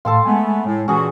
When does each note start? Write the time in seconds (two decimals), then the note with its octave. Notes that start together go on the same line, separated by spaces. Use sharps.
0.05 A2 A4 F5 A5 C6
0.25 G#3 A3 B3 G#5
0.66 A2
0.88 A#2 E3 C#4 F#4 G#4